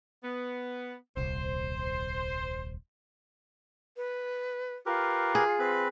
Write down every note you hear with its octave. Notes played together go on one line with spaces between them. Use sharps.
B3
D#1 C2 C5
B4
F4 G4 A#4 B4
G#4
C4 B4 B5